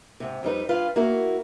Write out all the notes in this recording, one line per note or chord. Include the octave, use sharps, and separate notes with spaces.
G#2 C3
F2 G3 D#4 B4
G2 F4 B4 F5
A#3 E4 F#4 A#4